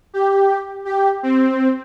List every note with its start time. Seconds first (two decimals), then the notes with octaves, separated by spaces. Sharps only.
0.14 G4
0.85 G4
1.23 C4